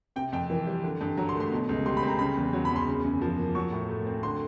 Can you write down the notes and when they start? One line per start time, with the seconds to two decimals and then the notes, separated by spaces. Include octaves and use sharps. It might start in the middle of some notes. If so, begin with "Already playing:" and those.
0.16 C3 G5
0.32 F2 G5
0.50 E3
0.67 G3
0.83 D3
1.01 G2
1.17 F#3 A#5
1.29 C6
1.35 A3
1.40 C6
1.52 B2
1.69 C#2
1.86 G3 C6
1.97 B5
2.03 C4
2.08 A#5
2.19 C#3 B5
2.37 E2
2.53 F#3
2.65 B5
2.70 E2
2.76 C6
2.88 C#3
3.04 F#2
3.21 F3
3.38 A#3
3.55 F#3 C#6
3.72 A2
3.89 A3
4.06 C4
4.23 D3 C6